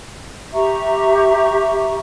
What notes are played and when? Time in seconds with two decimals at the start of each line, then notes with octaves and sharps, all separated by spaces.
0.52 G4 E5 A#5 C#6